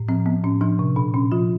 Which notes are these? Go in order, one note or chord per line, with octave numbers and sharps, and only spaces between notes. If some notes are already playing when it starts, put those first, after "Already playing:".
Already playing: A2
F3 C4
F3 B3
A2 C#4
F3 D4
C3
A#2 D4
A#2 C#4
F3 F4